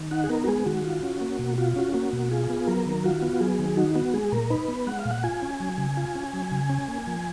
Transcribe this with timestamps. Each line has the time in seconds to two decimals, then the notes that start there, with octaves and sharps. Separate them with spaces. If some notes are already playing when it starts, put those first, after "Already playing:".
Already playing: D#3
0.11 D#4 F#5
0.24 G#4
0.30 B3 A#4
0.44 F#4
0.48 G#3 G#4
0.66 D#3 F#4
0.84 F4
1.03 C#4
1.21 A#3
1.39 B2
1.58 F4 F#4
1.76 C#4 F#4
1.94 A#3 F#4
2.13 B2
2.31 F4 G#4
2.50 B3
2.67 F#3 A#4
2.86 D#3
3.04 F4 F#4
3.22 B3
3.40 F#3 G#4
3.59 D#3
3.77 D#4 F#4
3.95 B3 F#4
4.14 G#3 G#4
4.32 A#2 A#4
4.50 D#4 B4
4.68 B3
4.87 G#3 F#5
4.99 F5
5.05 A#2
5.11 F#5
5.23 F4 G#5
5.42 C#4
5.60 F#3
5.78 C#3
5.97 F4
6.15 C#4
6.33 F#3
6.52 C#3
6.70 C#4
6.88 A#3
7.07 F3